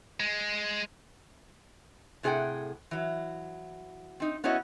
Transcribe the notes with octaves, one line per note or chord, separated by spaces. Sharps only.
G#3
A2 C3 G#4 A#4 F#5 G5
E3 F#3
C4 D#4
B3 C#4 E4 F#4 C#5 D#5